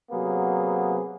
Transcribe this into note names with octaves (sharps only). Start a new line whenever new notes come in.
C3 F#3 A#3 B3 G#4